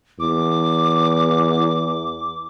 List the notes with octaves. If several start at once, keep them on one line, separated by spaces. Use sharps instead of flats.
E2 D6